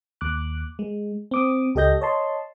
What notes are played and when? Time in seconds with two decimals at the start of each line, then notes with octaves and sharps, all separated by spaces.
0.21 D#2 D6 F#6
0.79 G#3
1.31 C4 D6 D#6
1.75 C#2 G4 A4 D#5 G6 A#6
2.01 C#5 D#5 A5 C6